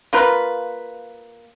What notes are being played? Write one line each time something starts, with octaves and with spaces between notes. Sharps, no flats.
A#3 F4 B4